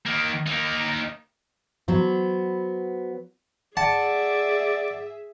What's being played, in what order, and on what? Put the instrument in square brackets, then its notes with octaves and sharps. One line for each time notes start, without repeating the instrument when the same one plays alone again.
[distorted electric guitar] D#3 A#3
A#3 D#4
[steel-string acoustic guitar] F#3 B3 C5
[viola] G#4 E5 [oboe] D5 [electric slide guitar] F#5 [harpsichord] A5